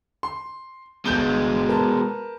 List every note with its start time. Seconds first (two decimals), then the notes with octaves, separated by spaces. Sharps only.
0.23 C6
1.05 G1 B2 G#3 G6 G7
1.69 A#4 B4 A5